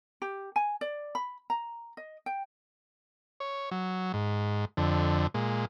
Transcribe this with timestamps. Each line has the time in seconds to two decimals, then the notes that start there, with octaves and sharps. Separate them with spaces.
0.22 G4
0.56 G#5
0.81 D5
1.15 B5
1.50 A#5
1.97 D#5
2.26 G5
3.40 C#5
3.71 F#3
4.14 G#2
4.77 F2 D3
5.34 A#2 G#3